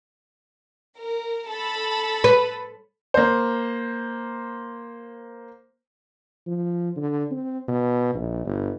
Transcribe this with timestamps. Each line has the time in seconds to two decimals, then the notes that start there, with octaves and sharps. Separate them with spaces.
0.96 A#4
1.47 A4 A5 B5
2.24 B4
3.14 A#3 C5
6.47 F3
6.96 D3
7.31 C4
7.68 B2
8.15 A#1
8.45 G1